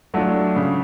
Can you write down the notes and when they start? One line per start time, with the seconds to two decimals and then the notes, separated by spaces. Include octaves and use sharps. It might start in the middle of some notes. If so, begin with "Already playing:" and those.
0.14 F#3 A3 D4 F4
0.56 C#3